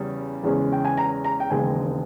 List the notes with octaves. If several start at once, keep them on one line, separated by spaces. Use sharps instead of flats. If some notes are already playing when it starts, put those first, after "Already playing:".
Already playing: E2 C#3 G3 C#4
E2 C#3 G#3 C#4
G5
G#5
A#5
A#5
G5
E1 D#2 C#3 G#3 G#5